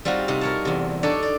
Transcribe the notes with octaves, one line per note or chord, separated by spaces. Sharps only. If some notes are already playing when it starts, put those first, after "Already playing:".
G3 C4 D#4 F4 F#4
C3 D#4
A#4 C#5 A5
E2 C3
D4 D#4 A4 C#5 D5
D5